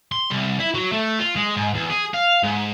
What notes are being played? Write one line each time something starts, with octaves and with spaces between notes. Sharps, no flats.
C6
C2
E4
F#3
A3
F4
G#3
G#2
E2
G#4
F5
G#2